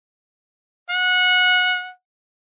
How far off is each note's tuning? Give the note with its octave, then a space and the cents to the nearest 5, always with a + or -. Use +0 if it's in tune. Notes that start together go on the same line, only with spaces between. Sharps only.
F#5 -20